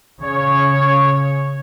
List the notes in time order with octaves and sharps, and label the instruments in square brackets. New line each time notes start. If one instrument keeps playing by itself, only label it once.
[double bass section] C#3 [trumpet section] C#5